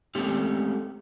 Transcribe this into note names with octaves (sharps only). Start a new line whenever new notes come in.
G#3 A3 C4 C#4 G4 A4